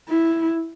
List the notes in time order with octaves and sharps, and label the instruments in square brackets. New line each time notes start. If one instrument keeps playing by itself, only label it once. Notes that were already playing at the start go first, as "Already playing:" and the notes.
[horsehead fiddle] E4